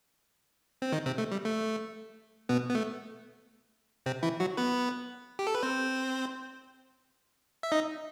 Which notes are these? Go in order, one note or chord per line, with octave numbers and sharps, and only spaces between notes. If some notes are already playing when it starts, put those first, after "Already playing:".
C4
D#3 D#4
C3 C4
A3
G3
A3
B2 B3
B3
A3
C3 C4
E3 E4
F#3 F#4
B3 B4
G4
A4
B4
C4 C5
E5
D#4 D#5